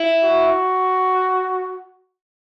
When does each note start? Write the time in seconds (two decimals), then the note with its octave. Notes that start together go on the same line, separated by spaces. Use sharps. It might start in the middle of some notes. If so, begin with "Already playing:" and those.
Already playing: E4
0.23 F#4